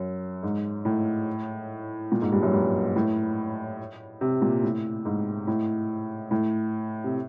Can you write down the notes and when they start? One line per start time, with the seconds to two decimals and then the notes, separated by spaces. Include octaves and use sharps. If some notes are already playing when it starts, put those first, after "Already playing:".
Already playing: F#2
0.43 G#2
0.85 A2
2.12 A#2
2.22 G#2
2.32 G2
2.43 F#2
2.53 G2
2.96 A2
4.21 C3
4.42 A#2
4.63 A2
5.05 G#2
5.47 A2
6.31 A2
7.04 C3